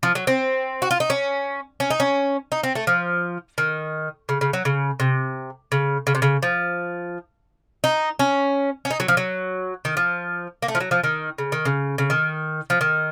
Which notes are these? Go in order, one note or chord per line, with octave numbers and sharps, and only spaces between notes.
F3
F#3
C4
F#4
F4
D#4
C#4
C#4
D#4
C#4
D#4
C4
A3
F3
D#3
C#3
C#3
F#3
C#3
C3
C#3
C#3
C3
C#3
F3
D#4
C#4
C#4
D#4
F#3
F3
F#3
D#3
F3
A#3
A3
F3
F#3
F3
D#3
C#3
D#3
C#3
C#3
D#3
F3
D#3